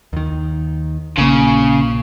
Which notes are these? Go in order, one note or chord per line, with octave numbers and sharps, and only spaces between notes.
D#2 D#3
A#1 A#2 C#3 A#3